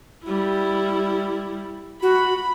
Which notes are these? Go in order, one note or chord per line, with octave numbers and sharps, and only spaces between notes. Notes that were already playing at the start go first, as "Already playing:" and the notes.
G3 E4
F#4 B5